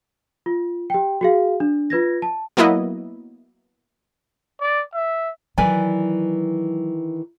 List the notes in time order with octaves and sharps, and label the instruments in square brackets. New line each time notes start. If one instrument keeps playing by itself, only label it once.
[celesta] F4
G4 G5
F#4 G#4 F5
D4
F4 B4 G#6 A#6
A5
[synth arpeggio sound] F#3 A#3 B3 E4 D#5
[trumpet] D5
E5
[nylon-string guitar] D#3 E3 [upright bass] F#3 [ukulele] B4 D5 G#5